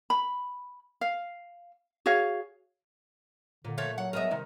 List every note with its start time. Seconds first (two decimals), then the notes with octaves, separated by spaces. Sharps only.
0.10 B5
1.01 F5
2.06 F#4 G#4 C#5 F5
3.65 A#2 D3
3.78 F3 A3 C#5
3.98 F#3 F#5
4.13 G#3 B3 A#4 D#5 E5
4.31 C3 D#3